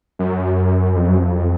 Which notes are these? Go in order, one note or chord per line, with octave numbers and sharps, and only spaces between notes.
F#2
F2
F#2
F2